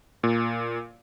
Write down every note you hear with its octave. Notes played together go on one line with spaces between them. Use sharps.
A#2